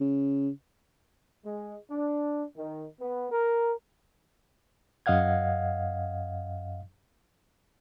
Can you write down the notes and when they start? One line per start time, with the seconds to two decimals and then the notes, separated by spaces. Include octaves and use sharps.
0.01 C#3
1.44 G#3
1.91 D4
2.56 D#3
3.00 B3
3.32 A#4
5.06 F#2 D#5 F5 F#5 G#6